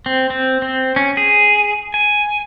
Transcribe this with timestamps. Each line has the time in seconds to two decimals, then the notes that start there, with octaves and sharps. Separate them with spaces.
0.06 C4
0.30 C4
0.62 C4
0.96 C#4
1.17 G#4
1.94 G#5